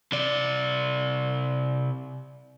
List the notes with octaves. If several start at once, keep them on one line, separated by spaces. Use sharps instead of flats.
C3 D5